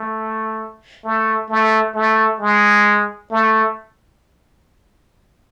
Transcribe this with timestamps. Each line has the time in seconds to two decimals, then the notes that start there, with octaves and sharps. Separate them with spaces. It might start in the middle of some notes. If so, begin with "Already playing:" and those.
Already playing: A3
1.05 A3
1.49 A3
1.95 A3
2.40 G#3
3.31 A3